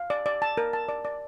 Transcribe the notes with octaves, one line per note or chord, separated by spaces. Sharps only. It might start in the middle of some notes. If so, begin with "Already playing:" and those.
Already playing: F5
D5
D5
A5
A#4
A5
D5
D5